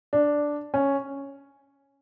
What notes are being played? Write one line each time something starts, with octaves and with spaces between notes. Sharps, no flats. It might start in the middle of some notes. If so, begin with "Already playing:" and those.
D4
C#4